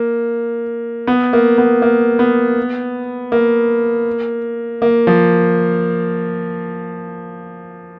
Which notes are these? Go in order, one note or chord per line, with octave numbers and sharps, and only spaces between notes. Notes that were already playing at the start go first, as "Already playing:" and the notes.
Already playing: A#3
B3
A#3
B3
A#3
B3
A#3
A#3
F3